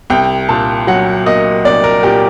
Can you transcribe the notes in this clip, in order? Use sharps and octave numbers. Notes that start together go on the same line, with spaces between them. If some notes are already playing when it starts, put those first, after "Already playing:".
C2 G5
A#2 A5
F#3 F#5
A#3 D#5
C2 D5
A#4
A#2 G4